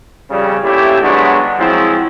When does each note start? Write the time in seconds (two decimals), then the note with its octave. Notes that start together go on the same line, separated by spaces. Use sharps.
0.30 F2 C#3 G3
0.64 A#2 A3 C#4 E4 G4
1.02 D#3 F#3 G#3 B3 D4 F#4
1.59 F3 F#3 G#3 C4 E4 F#4